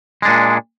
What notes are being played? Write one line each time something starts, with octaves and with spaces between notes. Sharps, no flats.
A#2 G#3 D4